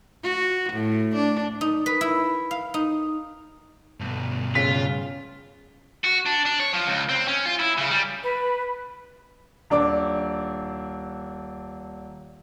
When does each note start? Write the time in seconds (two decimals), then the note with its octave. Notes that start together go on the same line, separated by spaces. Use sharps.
0.24 F#4
0.72 A2
1.15 D4
1.61 D#4
1.86 B4
2.01 E4
2.51 F5
2.74 D#4
4.00 G2 B2
4.55 C#3 F4 B6
6.04 F#4
6.26 D4
6.45 D4
6.60 C#5
6.73 F3
6.87 C#2
7.09 C4
7.28 C#4
7.46 F4
7.60 E4
7.78 C#3
7.91 G3
8.23 B4
9.70 D#1 D4 D6